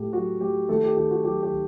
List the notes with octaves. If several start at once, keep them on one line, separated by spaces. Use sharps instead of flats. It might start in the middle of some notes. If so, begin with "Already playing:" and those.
Already playing: A2 A3 G4
F#3 F#4
A3 G4
D#3 A3 A4
G4
D#3 G4
F#4
F#3 G4
G4
D#3